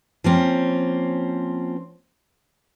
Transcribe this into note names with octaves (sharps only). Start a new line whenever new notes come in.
F3 A#3 C4 C#4